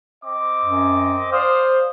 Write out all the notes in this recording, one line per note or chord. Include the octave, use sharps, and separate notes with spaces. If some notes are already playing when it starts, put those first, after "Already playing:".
C4 D#5 D6
F#2
C5 D5 F5 D#6